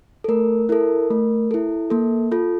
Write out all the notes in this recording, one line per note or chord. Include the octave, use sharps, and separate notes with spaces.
A4
A3 A#4
E4 A4 A#4
A3
E4 A4
A#3 A4
F4 A4